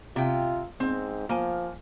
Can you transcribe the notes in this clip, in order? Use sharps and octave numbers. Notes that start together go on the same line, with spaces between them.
C3 F4 G5
G#2 C4
F3 A#3 G#5